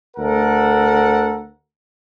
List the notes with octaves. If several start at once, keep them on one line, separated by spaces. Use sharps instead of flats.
D2 A4 A#4 F#5